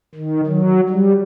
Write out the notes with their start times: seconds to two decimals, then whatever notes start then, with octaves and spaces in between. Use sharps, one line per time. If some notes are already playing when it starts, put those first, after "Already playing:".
0.15 D#3
0.47 F#3
0.89 G3